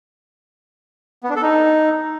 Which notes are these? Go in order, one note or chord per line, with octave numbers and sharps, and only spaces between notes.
B3
D4
A4
D#4